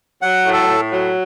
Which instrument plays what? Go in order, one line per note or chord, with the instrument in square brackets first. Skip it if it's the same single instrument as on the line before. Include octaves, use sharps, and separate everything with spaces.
[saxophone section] F#3 [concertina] F#5
[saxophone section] A2
[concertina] A4
[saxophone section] A2
F#3